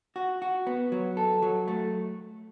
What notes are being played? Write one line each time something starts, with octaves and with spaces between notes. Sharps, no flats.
F#4
F#4
B3
F#3
A4
F#3
A3